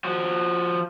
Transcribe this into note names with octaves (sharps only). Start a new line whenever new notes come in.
F3 F#4